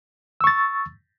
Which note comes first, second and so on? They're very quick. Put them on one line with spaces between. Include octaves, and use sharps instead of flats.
E6 C#6 A6